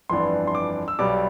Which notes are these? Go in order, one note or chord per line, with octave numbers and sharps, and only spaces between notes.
G1 F2 E3 B3 D4 C6
C6
D6
E6
B1 B2 G3 D6